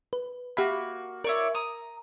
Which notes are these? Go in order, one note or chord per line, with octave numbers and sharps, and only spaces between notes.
B4
A#3 F#4 G4 E5 B5
E4 A#4 C#5 D5
A#5 D#6